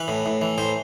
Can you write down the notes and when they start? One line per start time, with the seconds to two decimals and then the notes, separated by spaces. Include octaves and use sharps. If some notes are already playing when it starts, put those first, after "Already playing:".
Already playing: E3 B4
0.08 A2
0.26 A2
0.41 E3
0.58 A2 C5